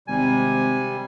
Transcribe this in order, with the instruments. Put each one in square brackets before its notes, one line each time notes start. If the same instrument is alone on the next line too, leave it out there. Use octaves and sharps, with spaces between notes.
[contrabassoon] G#1 [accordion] C3 G3 [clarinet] G#5